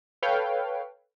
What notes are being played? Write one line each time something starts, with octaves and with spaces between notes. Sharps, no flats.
A4 B4 C#5 F5 G5